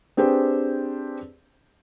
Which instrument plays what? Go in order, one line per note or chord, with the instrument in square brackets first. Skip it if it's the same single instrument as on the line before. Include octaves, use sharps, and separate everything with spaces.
[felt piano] C4 D4 G4 G#4 B4 C5